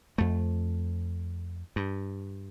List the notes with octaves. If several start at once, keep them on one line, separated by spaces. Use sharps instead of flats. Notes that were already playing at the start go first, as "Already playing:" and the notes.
F2 A3
G2